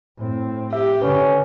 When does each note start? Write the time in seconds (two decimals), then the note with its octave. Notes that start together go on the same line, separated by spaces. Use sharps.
0.18 A2 C4
0.73 G4 E5
1.02 D3 C#4 B4